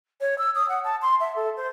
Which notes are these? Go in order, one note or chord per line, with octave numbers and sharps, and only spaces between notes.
C#5
E6
D#6
F#5
A5
C6
E5
A4
C5